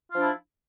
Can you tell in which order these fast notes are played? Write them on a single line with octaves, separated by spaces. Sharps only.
F4 F3 D4 E4